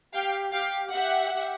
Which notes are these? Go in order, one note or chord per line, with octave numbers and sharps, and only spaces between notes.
G4 F5 G5
G4 F5 G5
G4 E5 F#5
G4